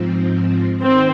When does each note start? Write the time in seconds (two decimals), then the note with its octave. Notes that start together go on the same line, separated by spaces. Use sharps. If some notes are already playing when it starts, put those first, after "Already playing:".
Already playing: G#2 F3 C4
0.82 D#3 C4